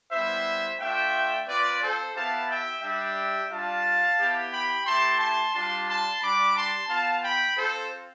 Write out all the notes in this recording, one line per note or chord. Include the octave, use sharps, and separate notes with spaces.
G3 B3 E4 C5 E5
A3 D4 F4 E5 G5
C4 F4 B4 D5
A4 C5
B3 E4 G4 F5 A5
E5 G5
G3 D4 G4 E5 G5
G3 D4 F4 F5 A5
B3 E4 G4
G5 B5
A3 E4 G4 A5 C6
A5 C6
G3 D4 F4 A5 C6
A5 C6
G3 D4 G4 B5 D6
A5 C6
B3 F4 F5 A5
G5 B5
C4 F4 A4 C5